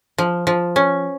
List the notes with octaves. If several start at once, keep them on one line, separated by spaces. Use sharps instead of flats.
F3
F3
C#4